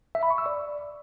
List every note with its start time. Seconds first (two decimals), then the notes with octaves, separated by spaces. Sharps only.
0.15 E5
0.23 B5
0.30 C#6
0.38 E6
0.46 D5